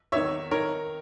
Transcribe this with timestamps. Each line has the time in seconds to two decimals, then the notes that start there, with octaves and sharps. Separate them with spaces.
0.12 E2 D#3 C#5 E5
0.51 D#3 A#4 C#5